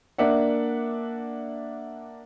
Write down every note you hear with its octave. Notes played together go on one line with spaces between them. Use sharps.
A#3 D4 D5 E5 F#5